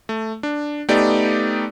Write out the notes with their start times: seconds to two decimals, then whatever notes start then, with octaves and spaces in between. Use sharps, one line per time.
0.09 A3
0.43 D4
0.89 A3 B3 D#4 G4 D5